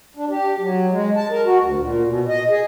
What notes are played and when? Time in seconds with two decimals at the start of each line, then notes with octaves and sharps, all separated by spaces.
0.17 D4
0.30 G4
0.60 F#3
0.91 G#3
1.16 A5
1.31 A#4
1.46 F#4
1.62 D2
1.79 A#2
2.05 B2
2.28 D#5
2.50 G#4